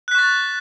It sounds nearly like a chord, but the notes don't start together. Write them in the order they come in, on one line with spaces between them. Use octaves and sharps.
F#6 B6 C#6 A6